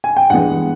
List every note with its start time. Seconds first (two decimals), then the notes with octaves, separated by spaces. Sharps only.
0.04 G#5
0.17 G5
0.30 G2 E3 G#3 B3 F#5